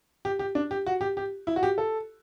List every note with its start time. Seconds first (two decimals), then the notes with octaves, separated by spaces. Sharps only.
0.25 G4
0.39 G4
0.55 D4
0.71 G4
0.86 F#4
1.01 G4
1.17 G4
1.47 E4
1.56 F#4
1.63 G4
1.78 A4